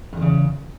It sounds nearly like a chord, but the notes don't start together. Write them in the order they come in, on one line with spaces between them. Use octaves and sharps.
G2 E2 C#3